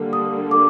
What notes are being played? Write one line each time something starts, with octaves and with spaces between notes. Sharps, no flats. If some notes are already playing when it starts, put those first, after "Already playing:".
Already playing: D3 G3 A#3
D#6
D6